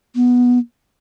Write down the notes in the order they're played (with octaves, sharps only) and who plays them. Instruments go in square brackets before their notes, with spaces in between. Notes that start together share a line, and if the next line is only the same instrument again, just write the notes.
[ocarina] B3